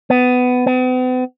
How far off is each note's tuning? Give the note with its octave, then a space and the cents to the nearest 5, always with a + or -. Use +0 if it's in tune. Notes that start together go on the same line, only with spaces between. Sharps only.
B3 +15
B3 +45